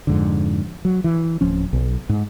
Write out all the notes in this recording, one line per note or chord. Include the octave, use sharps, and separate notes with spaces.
F2 G#2 D3
F#3
E3
D1 F3 C#4
B1
G#2